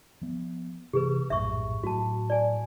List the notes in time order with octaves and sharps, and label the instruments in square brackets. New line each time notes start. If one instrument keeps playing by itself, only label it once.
[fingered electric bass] F3 B3
[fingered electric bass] C3 E3 A3 [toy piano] G4 G#4 B4
[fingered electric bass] A#1 F#2 A2 [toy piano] E5 C#6
[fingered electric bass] A2 F#3 [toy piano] F#4 A5
[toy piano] D5 G#5